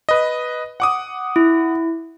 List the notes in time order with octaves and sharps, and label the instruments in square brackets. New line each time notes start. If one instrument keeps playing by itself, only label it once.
[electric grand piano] B4 D#5
F#5 D6 D#6
[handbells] E4